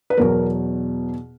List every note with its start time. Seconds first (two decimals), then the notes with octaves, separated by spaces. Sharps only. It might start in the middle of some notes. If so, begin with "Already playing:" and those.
0.10 B4
0.17 E2 B2 F#3 A#4